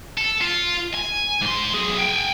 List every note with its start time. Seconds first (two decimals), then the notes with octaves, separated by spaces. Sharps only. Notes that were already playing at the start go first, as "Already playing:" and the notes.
0.17 A4
0.41 F4
0.95 G#5
1.42 G#2 C6
1.74 B1 G#4
1.99 G5 G#5